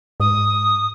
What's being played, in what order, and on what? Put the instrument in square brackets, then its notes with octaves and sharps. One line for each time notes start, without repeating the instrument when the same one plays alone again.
[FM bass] G#2 [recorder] D#6